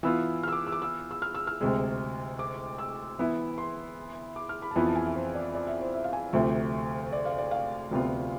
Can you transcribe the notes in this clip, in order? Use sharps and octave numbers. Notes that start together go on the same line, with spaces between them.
E3 B3 F4 E6
F6
E6
D6
E6
D6
E6
E6
F6
E6
F6
D2 C3 G#3
D6
E6
E3 B3 E4
C6
D6
F6
B5
A5
F2 E3 B3 B5
A5
G#5
E5
C5
D5
D5
E5
C5
E5
F5
G#5
D2 C3 F3 A3 E5
D5
F5
D5
F5
D2 C3 F3 B3 F4